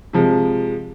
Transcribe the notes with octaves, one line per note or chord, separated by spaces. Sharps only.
C3 F3 G#3